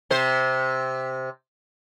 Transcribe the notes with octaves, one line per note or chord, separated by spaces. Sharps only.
C3 C5